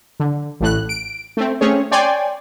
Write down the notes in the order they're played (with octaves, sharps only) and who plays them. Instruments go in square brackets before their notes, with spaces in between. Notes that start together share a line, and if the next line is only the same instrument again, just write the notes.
[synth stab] D3
A1 A2 F#6
D7
A3 C4
A3 C4 C#4 G#4 C#5
C#5 D5 G5 G#5 C6